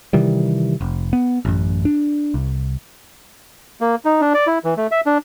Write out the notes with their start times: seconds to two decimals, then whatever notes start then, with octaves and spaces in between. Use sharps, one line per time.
0.13 C3 D#3 E3 G3
0.81 F1
1.13 B3
1.45 A1 F#2
1.85 D4
2.34 C2
3.81 A#3
4.05 D#4
4.21 D4
4.34 D5
4.47 E4
4.64 E3
4.77 A3
4.91 E5
5.06 D4